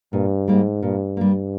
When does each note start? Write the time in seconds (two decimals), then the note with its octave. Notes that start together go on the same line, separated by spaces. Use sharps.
0.13 G2 A#2
0.48 G#2 G3 A#3
0.82 G2 A#2
1.17 G3 A#3